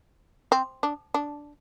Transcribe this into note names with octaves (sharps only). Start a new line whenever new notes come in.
C4
D4
D4